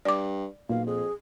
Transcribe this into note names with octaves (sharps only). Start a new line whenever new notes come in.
G2 D5 D6
B1 A#2 F5
F2 G#4